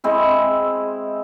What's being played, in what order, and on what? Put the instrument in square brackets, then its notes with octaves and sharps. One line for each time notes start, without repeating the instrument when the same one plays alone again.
[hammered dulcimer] G#3 C4 E4